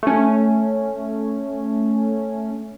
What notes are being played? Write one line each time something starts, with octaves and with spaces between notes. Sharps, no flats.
A3 C#4